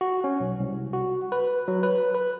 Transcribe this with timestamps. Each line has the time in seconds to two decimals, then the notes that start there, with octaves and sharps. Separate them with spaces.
0.01 F#4
0.24 C#4
0.40 B1
0.60 C2
0.93 F#4
1.32 B4
1.68 F#3
1.83 B4
2.15 B4